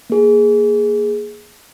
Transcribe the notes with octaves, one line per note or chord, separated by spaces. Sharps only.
A#3 G#4